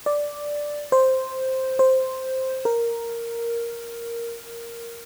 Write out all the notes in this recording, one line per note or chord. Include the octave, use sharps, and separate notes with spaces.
D5
C5
C5
A#4